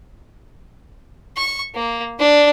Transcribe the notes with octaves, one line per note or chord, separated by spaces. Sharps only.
C#6
A#3
D4